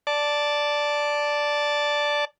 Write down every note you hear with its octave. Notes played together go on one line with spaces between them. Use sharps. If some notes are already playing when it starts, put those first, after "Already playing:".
D5 A5